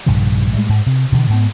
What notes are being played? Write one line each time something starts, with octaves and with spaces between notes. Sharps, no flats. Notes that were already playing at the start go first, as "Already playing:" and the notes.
A#1 G2 C3 D#3
A2 G3 G#3
G#2
C3
B2 D3 E3
G#2 B3